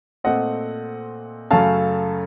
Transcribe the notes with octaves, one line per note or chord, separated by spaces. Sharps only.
A#2 A3 C4 D#5 F#5
F#2 C#3 A3 C#4 F5 A5